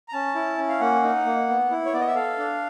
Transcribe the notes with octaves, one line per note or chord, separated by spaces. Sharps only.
A#5
C#4 A5
E4
C#4
F5
A#3 F#5
D#4
A#3
B3
E4
C#5
B3 D5
D#5
E5
A4 F5
D4